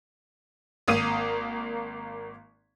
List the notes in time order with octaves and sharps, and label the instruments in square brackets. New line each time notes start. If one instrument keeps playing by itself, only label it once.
[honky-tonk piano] G#1 A#3 D#6 D#7